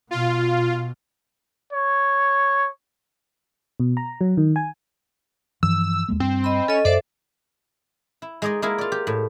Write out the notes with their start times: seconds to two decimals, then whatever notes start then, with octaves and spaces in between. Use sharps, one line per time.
0.11 B2 F4
1.73 C#5
3.80 B2
3.97 A#5
4.21 F#3
4.37 D#3
4.56 G#5
5.63 G2 E3 F3 E6
6.09 D#2 G#3 A#3
6.20 G2 C4
6.44 D#5 B5
6.68 C#4 A4 D#5
6.85 F#2 A4 C5 D5 E5
8.22 E4
8.42 G#3 D#4 G#4 D5 D#5
8.62 G#3 A#3 E4 G#4 A#4
8.78 F4 D5
8.92 G4
9.07 A2